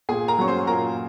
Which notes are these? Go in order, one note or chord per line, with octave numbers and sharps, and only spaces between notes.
A#2 G#4 G#5
A#4 A#5
F#3 C#4 C#6
C5 C6
A#2 A#4 A#5